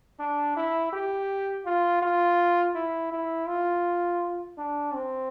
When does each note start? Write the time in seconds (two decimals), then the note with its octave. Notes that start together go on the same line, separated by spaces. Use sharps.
0.19 D4
0.56 E4
0.93 G4
1.66 F4
2.02 F4
2.75 E4
3.12 E4
3.48 F4
4.58 D4
4.94 C4